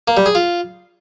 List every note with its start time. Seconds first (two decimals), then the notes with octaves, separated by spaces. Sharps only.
0.08 A#3
0.17 G3
0.26 G#4
0.35 F4